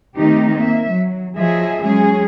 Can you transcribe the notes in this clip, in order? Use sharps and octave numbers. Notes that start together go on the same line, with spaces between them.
D#3 A3 C4 D#4 G4
A#3 E5
F#3
F3 F#3 G#4 D#5 E5
F#3 G#3 C#4 G#4